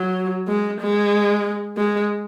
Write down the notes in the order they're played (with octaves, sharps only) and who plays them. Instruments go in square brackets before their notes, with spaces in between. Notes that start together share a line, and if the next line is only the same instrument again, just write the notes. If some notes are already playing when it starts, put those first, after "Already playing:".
Already playing: [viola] F#3
G#3
G#3
G#3